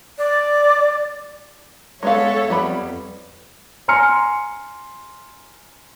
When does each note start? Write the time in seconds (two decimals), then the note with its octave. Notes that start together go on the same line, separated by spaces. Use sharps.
0.18 D5
2.03 G#3 B3 A4 C#5 E5 F5
2.50 F2 G3 B3 B5
3.88 G#5 A#5 C6 F6 C#7